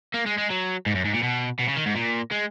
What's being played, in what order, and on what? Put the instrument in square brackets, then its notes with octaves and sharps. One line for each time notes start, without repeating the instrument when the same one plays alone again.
[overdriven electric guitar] A#3
G#3
G#3
F#3
G#2
F#2
G#2
A#2
B2
B2
C#3
D#3
G#2
A#2
G#3